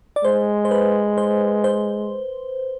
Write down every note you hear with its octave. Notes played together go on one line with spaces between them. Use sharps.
D5
G#3 C5
C5
B4
C5
C5